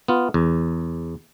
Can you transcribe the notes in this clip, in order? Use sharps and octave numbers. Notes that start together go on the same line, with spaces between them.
B3 F4
E2